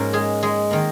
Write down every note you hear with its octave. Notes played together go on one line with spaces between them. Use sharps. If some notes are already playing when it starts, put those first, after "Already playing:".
Already playing: G#2 F3 A#3 C#4 A#4
G#3 G#4
G#3 G#4
D#3 A#3